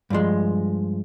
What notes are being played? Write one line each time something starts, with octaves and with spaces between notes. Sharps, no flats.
G2 F3 G#3